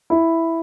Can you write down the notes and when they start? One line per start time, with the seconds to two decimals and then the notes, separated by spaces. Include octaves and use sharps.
0.10 E4